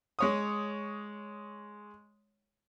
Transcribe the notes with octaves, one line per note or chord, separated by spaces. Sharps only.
G#3 C#5 D#6